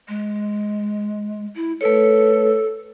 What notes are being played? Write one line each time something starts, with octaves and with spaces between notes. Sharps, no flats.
G#3
E4
A3 A4 B4 C#5